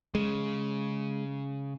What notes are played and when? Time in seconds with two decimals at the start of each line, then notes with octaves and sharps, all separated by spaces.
0.15 C#3 G#3